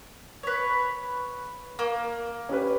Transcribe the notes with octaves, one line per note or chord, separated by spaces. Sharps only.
B4 C#5
A#3
C#4 G4 B4